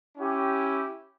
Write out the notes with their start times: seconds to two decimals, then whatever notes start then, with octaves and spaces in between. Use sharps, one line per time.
0.18 C#4 E4 G4